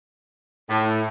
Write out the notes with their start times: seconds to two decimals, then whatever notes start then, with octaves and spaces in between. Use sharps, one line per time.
0.70 A2